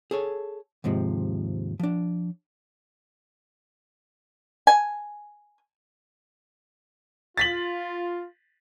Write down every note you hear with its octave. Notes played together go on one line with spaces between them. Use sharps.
G#4 A4 C#5
D#2 G#2 C3 F3 G#3
F3 D4
G#5
F4 A6 B6 F#7